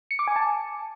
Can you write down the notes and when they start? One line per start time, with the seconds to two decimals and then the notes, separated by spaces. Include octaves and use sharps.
0.11 C#7
0.19 D6
0.27 G#5
0.36 A5